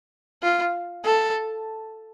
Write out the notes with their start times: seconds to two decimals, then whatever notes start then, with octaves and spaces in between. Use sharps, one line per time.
0.43 F4
1.04 A4